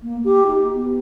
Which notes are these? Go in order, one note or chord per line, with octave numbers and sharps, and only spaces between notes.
A#3
G4
D#4
B3